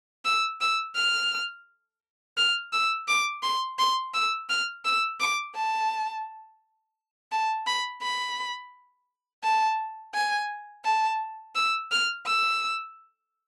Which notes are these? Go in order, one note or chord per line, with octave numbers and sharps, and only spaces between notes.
E6
E6
F6
F6
E6
D6
C6
C6
E6
F6
E6
D6
A5
A5
B5
B5
A5
G#5
A5
E6
F6
E6